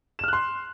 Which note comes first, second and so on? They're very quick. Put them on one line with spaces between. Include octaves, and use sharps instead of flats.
E7 F6 F#6 C6